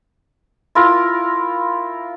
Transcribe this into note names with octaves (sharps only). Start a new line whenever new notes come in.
E4 F4 A#4